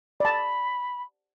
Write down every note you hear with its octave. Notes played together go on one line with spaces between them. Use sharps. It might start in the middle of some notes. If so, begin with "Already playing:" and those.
D5 A5 B5